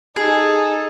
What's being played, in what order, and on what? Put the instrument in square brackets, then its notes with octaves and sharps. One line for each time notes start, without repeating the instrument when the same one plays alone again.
[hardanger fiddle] D#4 A4 [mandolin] G#4